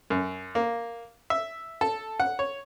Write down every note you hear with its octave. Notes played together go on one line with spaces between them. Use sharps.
F#2
A#3
E5
A4
F#5
C#5